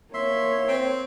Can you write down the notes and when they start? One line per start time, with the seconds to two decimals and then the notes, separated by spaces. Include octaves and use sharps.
0.14 A#3 C#5 E5 C6
0.68 C4